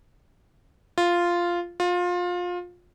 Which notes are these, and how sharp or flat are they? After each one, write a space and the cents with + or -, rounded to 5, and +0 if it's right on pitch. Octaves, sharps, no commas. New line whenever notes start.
F4 -5
F4 +25